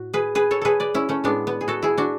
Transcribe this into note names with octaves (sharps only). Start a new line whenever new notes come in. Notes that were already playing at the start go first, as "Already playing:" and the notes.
Already playing: A2 F#4
G#4 B4
G#4 B4
A4 C#5
G#4 A4 B4
B4 D5
C#4 E4
A3 C#4
A2 G#3 B3 D4
B3
G#4
F#4 A4
E4 G#4
D4 F#4